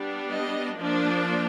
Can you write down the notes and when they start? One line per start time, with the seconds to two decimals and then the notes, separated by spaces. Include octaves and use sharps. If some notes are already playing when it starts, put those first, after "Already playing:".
Already playing: G3 B3 D4
0.31 D#5
0.76 F3 A#3 D4